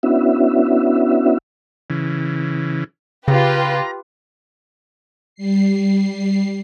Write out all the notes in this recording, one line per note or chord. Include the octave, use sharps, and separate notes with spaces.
B3 C#4 D4 E4 F#4 E5
C#3 E3
C#3 F4 G4 B4 A#5
G3 C7